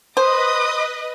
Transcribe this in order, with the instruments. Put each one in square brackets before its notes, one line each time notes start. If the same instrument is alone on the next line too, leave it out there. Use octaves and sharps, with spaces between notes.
[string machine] B4 D#5 [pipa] C5 [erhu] D#6